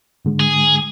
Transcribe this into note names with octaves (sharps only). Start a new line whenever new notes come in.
G#2 D3 G#3
G#4